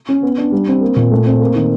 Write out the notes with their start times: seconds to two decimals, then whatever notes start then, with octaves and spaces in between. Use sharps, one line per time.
0.09 C#4
0.22 B3
0.38 D4
0.52 G3
0.68 C4
0.81 A#3
0.96 A#2
1.12 A3
1.26 C4
1.41 A#3
1.55 D#3